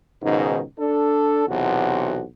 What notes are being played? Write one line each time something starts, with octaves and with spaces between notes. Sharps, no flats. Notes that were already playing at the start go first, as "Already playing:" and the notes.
C#2 G#2 B2 D#3
D4 A4
B1 E2 C3 F#4